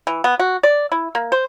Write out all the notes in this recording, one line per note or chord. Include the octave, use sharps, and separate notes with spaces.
E3
B3
F#4
D5
E4
A#3
C5